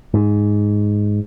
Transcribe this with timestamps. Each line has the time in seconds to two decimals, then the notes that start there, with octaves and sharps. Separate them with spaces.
0.14 G#2